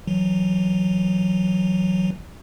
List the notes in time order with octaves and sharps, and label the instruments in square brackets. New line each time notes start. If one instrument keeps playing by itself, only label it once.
[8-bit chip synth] E3 F#3